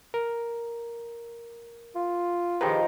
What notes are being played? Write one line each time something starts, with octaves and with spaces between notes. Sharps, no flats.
A#4
F4
D#3 F3 G4 G#4 B4